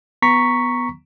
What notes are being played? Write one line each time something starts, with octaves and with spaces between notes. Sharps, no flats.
B3 A#5 C#6 B6